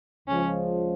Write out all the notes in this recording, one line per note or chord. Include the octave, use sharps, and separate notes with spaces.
C#2 C#3 F3 G#3 C#4